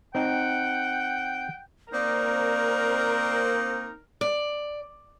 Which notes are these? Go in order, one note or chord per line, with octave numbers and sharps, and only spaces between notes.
C4 D#4 F#5 G5
A#3 C4 D#4 A#4 D5
D5